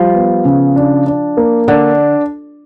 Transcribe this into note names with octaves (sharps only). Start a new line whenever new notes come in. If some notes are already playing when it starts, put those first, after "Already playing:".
Already playing: F3 G3
B3
C#3
D4
D4
A#3
D3 D4